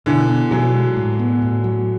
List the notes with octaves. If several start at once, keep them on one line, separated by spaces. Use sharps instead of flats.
B2 D3 E3
B3
B2 E3 F#3
G#3
A2
B3
A2
F#3